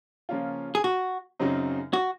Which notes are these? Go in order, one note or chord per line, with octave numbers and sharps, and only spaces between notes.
C#3 F3 A#3 C#4 F4
G#4
F#4
F#2 C#3 F#3 C4 D#4
F#4